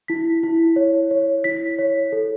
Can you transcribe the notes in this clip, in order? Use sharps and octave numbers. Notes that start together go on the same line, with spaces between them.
E4 B6
E4
C#5
C#5
E4 B6
C#5
A4